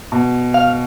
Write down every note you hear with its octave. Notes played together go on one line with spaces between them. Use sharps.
B2
F5